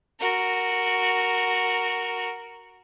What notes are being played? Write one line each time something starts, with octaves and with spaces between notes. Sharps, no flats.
F#4 A#4